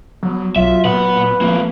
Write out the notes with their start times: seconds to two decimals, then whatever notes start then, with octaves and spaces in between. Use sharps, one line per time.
0.23 F#3 B3
0.56 B1 F#3 F4 E5
0.85 A#2 B3 B4 F#5
1.41 F3 G#3 A#3